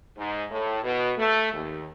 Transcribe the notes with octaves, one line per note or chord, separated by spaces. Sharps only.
G#2
A2
B2
A3
D#2